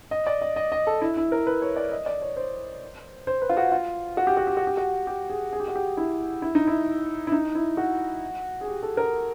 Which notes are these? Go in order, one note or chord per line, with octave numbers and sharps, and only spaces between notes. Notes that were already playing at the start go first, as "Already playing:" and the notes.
D#5
D5
D#5
D#5
D#5
A4
E4
E4
A#4
B4
C#5
D5
D#5
D5
C#5
C5
C5
B4
F4
F#4
F4
F#4
G4
F#4
G4
F#4
G4
F#4
G4
G#4
G#4
G4
F#4
G4
E4
E4
D#4
E4
E4
D#4
E4
F#4
G#4
G4
A4
A#4